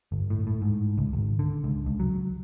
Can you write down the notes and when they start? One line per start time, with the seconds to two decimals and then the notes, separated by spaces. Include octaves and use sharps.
0.12 G1
0.30 A2
0.47 A2
0.62 G#2
0.98 C#2
1.13 G#1
1.39 D3
1.64 C#2
1.86 C#2
2.00 F#3